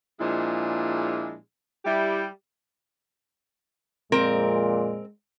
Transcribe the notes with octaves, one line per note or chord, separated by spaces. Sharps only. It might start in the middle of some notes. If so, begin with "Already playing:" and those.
A#2 F3 G#3 D4 E4 G#4
G3 E4 G4
F2 A#2 G#3 C4 A#4